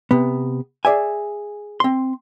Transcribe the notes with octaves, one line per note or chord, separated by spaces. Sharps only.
C3 B3
G#4 D5 E5 G#5
C4 C6